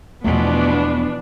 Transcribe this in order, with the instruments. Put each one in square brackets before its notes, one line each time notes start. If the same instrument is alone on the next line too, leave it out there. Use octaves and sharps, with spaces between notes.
[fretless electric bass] E2 A3 [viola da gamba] B2 E3 F3 [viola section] B3 D4